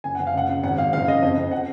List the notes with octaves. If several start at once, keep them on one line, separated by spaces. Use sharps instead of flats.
F#1 G#5
F#1 F#5
F5
C#2 F#5
C#2
G#1 F#5
G#1 F5
F#1 F5
F#1 D#5
F2 D#5
F2
F#5